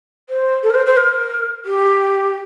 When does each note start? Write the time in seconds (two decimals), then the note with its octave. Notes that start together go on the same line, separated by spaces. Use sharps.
0.29 C5
0.62 A4
0.69 A#4
0.74 C5
0.85 C5
0.96 A#4
1.65 G4